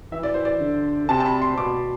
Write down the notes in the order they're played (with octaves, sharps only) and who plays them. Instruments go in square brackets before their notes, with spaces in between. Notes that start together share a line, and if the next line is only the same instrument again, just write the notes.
[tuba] E3 [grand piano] E5
[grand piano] D5
C5
D5
[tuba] D3
[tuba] C3 [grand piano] A5
[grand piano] A5
B5
C6
[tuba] B2 [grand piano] D6